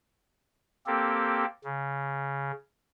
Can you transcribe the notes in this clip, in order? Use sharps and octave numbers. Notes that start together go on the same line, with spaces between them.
A#3 C4 G4 A4
C#3